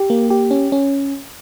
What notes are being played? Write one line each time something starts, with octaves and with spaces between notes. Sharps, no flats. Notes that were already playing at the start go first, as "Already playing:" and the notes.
Already playing: G4
A#3
G4
C#4
C#4